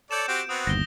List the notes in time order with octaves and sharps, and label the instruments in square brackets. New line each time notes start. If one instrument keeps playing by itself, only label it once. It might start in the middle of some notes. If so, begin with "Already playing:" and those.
[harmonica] A4 C#5 D5 [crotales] G6 E7
[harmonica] C4 F#4 G4 [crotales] D7
[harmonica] B3 C4 F#4 [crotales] D#6
[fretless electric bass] G1 D#2 [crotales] A#6 G7